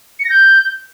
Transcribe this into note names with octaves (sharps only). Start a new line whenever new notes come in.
C#7
A#6
G6